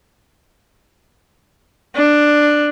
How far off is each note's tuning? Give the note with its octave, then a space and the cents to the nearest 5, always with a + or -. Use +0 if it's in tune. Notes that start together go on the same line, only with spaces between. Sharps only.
D4 +10